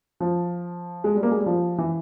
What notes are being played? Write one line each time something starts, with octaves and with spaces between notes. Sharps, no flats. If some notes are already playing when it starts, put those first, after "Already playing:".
F3
G#3
G3
A#3
G#3
G3
F3
E3